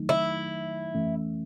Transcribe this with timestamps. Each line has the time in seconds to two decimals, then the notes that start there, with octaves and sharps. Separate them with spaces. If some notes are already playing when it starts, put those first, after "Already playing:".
Already playing: D#3 F#3 A3 D#4
0.09 E4
0.95 E3 A3 C#4